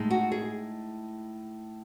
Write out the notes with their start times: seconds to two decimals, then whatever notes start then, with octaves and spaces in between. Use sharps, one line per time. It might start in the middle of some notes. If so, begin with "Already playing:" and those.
Already playing: A2 G#3 D#4
0.11 F#4
0.32 G#4